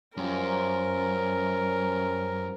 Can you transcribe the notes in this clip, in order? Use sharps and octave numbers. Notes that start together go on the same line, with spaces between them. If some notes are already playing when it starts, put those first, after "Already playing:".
F#2 F3 G3 C#4 A#4 C6